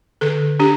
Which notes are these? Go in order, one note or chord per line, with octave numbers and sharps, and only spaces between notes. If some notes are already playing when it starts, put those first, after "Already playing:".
D3 A4
D4 G4